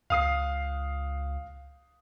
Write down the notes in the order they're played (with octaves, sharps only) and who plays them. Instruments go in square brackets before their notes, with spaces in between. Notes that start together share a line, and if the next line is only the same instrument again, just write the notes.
[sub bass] C#2 [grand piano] F5 D#6 C7